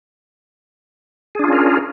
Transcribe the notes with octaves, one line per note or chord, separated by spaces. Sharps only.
C#4 D4 F4 G#4 A#4